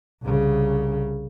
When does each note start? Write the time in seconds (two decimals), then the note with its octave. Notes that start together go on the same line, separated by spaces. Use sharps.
0.23 C2 C#3